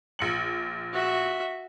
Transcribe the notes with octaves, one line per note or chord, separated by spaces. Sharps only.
A#1 C#7 F#7
F#4 E5